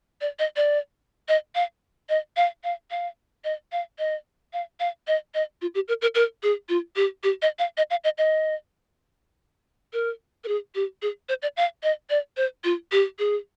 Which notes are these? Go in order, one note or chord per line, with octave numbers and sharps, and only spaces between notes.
D5
D#5
D5
D#5
F5
D#5
F5
F5
F5
D#5
F5
D#5
F5
F5
D#5
D#5
F4
G4
A#4
A#4
A#4
G#4
F4
G4
G4
D#5
F5
D#5
F5
D#5
D#5
A#4
A#4
G#4
G4
G#4
C5
D5
F5
D#5
D5
C5
F4
G4
G#4